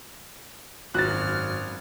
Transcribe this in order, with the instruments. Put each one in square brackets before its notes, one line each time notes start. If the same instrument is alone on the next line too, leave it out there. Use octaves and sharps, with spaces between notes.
[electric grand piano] G#1 [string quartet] F#2 F6 [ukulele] F#4 [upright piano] F#6 A6